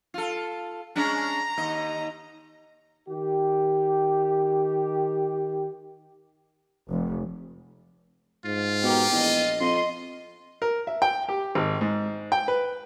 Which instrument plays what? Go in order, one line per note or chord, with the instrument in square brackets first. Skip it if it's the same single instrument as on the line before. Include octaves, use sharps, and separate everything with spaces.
[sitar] F4 A4
[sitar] G#3 C#4 D4 [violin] A#5
[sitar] D#2 D#5
[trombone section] D#3 G4
[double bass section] F1
[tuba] G#2 [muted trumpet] F4
[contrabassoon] B2 [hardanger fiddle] G4 A#4
[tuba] A#1 [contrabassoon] E2 [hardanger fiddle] D#5
[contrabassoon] F2 [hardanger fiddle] D#5 C6
[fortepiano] A#4
E5
G5
G4
G#1
G#2
G5
B4